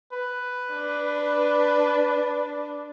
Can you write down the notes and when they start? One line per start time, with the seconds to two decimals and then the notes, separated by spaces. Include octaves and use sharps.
0.13 B4
0.73 D4